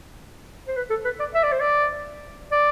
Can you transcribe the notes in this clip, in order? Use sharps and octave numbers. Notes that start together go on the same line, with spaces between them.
C5
B4
A4
B4
D5
E5
D5
C5
D5
D5